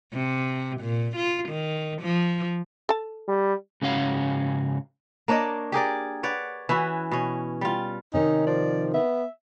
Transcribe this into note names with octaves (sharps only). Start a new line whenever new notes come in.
C3
A#2
F4
D#3
F3
A4 A5
G3
G#2 C#3 C#4 F#4 F5
A#3 D4 C#5 D#5
G4 G#4 A#4 D5
B4 C#5 D5 F#5
E3 C#4 E4 F#4
B2 C#4
G3 F4
C3 D#3 C#4 D#4
F3 D5
B3 E5